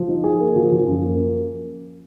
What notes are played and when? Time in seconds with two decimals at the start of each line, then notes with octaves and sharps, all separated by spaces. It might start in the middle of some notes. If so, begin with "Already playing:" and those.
Already playing: F3
0.08 D#4
0.24 G#4
0.41 A#3
0.56 F3
0.72 F3
0.87 F#2
1.03 A#3